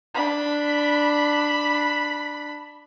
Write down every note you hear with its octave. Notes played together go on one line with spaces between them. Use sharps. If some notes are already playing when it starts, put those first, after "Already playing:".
D4 B5